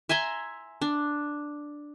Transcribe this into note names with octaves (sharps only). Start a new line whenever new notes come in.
E5 G#5 A#5 C6
D4